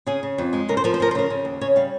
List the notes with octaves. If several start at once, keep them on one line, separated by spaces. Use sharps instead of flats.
C#3 G#4
C#3
F2
G#3
C#3 A#4
C5
F3 A#4
C5
F3 A#4
C5
C#3 A#4
C#3
D#2
C#3 C#5
G3 F5